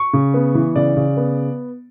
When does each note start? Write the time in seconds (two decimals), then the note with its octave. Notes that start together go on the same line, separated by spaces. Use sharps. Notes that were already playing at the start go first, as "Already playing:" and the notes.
Already playing: C#6
0.13 C#3
0.34 B3
0.55 E3
0.76 C#3 D5
0.96 C#3
1.17 B3